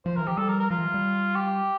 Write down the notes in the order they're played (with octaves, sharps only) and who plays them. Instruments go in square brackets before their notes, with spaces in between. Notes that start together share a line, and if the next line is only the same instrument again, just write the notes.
[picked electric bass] F3 [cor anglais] C5
[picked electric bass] E3 [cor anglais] A#4
[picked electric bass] F3 [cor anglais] G4
[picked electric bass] G3 [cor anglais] A4
[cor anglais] A#4
A#4
[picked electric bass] F3 [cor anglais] F4
[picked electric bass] E3
G3
[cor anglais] G4